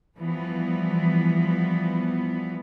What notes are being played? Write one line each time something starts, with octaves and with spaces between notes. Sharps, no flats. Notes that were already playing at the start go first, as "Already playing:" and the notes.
E3 F3 G3 B3